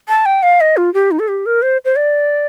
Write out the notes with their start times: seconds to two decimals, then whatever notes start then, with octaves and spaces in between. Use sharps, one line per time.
0.08 A5
0.26 G5
0.43 F5
0.61 D#5
0.77 F4
0.94 G4
1.11 D#4
1.19 A4
1.28 G4
1.46 A#4
1.62 C5
1.85 C5
1.96 D5